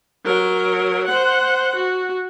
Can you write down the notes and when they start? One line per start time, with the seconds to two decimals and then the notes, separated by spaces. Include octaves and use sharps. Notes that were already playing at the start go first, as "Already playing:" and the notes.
0.25 F#3 A#4
1.07 C5 F#5
1.75 F#4